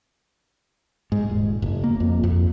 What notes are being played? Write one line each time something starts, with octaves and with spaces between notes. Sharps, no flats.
G#2
D#1
F#1
A#3
F2
F2